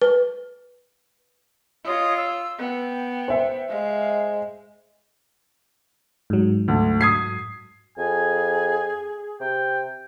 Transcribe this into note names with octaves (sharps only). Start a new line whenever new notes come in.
B4
F4 C#5 D#5 D#6
E6
B3 G5
C5 E5
G#3 F5
G#2 F#3
D2
D#6 G#6 C7
F2 G#4 G#5
C3 G5